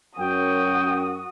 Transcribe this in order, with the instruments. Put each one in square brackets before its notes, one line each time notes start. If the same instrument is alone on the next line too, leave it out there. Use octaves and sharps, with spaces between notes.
[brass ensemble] F#2 [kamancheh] F#4 D#6 [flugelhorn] G5